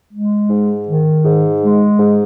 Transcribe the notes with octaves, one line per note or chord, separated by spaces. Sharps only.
G#3
G#2
D#3
G#2
G#3
G#2